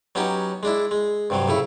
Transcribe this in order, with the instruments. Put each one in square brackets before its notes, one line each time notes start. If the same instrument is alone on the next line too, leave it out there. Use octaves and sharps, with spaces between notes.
[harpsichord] F#3 B3 C#4 D#4 G4
G#3 D4 E4
G#3
G2 C3 F#3
A2 C#3 E4